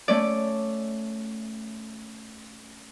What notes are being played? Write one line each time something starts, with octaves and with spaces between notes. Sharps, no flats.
A3 C#4 D5